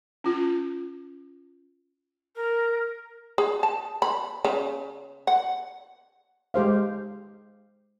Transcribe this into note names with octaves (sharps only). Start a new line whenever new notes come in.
C#4 F4
A#4
G#4
A5
B5
C#3
F#5
G#3 G4 C5 F5